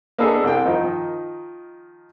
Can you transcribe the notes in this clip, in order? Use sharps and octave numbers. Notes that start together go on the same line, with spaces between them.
A#3 B3 D4 G#4 A4 D#5
C2 G5
D#3 F3 D#4